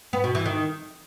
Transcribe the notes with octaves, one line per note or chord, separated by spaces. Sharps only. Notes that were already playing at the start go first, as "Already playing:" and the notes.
B3
B2
E3
D#3